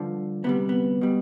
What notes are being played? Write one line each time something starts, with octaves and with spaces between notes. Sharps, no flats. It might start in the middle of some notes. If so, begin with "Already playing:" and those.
Already playing: G2 D3 F3
D2 C3 G3 B3
B3
B2 G3